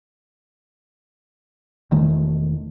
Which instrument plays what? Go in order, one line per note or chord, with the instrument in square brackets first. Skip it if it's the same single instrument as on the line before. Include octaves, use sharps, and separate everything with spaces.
[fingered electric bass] E1 D#3 A3